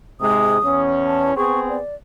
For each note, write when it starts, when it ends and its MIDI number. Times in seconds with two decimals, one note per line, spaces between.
0.21 0.58 44
0.21 0.58 48
0.21 0.58 56
0.21 0.81 87
0.62 1.36 40
0.62 1.36 61
1.06 1.32 81
1.36 1.79 59
1.36 1.79 60
1.36 1.79 68
1.36 1.60 85
1.69 1.95 74